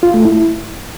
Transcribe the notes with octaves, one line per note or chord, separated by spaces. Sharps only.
F4
A3
E4